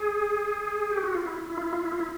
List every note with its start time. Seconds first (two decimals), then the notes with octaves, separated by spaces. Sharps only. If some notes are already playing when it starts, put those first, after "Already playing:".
Already playing: G#4
0.91 G4
1.03 F#4
1.15 F4
1.26 E4
1.50 E4
1.57 F4
1.62 E4
1.73 F4
1.85 E4
1.92 F4
2.00 E4